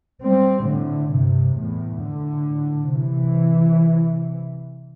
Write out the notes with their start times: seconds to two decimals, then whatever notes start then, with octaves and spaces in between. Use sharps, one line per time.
0.22 G3 C4
0.68 A2 D3
1.13 G2 C3
1.59 E2 A2
2.03 A2 D3
2.94 C3 E3